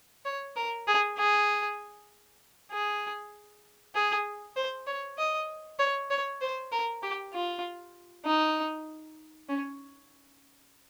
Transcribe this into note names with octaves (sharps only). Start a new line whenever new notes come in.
C#5
A#4
G#4
G#4
G#4
G#4
C5
C#5
D#5
C#5
C#5
C5
A#4
G4
F4
D#4
C#4